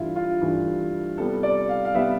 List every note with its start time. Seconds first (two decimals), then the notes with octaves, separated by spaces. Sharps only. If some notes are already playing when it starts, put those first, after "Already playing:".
Already playing: G2 E3 A3 E4 F4
0.16 F4
0.41 G2 E3 A3
1.17 C3 G3 B3 A4
1.43 D5
1.69 F5
1.85 F5
1.95 C3 G3 B3 E5